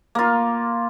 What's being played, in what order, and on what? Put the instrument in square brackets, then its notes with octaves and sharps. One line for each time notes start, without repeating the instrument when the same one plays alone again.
[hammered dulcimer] A#3 F4